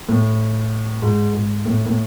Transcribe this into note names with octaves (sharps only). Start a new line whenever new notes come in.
A2
G#2
G#2
A2
A2